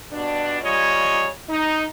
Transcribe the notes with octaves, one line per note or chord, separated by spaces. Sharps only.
G2 B2 D4
C#3 G3 F4 C#5 D#5
D#4